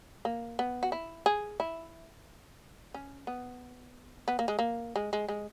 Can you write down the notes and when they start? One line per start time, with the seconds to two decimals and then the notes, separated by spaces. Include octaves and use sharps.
0.25 A#3
0.59 B3
0.83 F#4
0.92 E4
1.26 G#4
1.60 E4
2.94 C#4
3.27 B3
4.28 B3
4.39 A#3
4.48 G#3
4.59 A#3
4.96 G#3
5.13 G#3
5.28 G#3